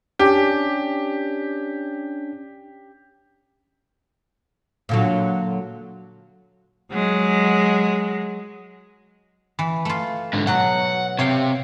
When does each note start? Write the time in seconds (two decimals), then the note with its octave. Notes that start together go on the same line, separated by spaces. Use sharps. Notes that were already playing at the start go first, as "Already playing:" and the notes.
0.19 C#4 D4 G4
4.89 A#2 D3 F#3
6.92 F#3 G#3
9.59 E3
9.85 A3 F4
10.33 G#2 D3
10.47 B2 F#3 F#4 F#5
11.19 C3 C#5 F5 G5